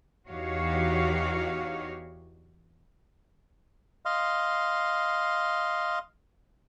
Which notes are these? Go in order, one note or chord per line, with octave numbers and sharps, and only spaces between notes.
E2 D#4 F#4 G4 C#5 F5
D#5 F5 C6